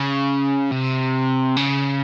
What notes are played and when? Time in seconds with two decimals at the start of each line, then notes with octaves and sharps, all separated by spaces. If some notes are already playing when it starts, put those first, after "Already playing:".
Already playing: C#3
0.72 C3
1.56 C#3